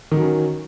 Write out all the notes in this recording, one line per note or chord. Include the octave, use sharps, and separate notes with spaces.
D#3 F#3 C#4